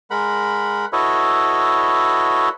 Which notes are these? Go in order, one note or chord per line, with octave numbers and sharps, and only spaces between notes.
G#3 A#4 F#5 B5
E4 F#4 A4 B4 C#5 D#5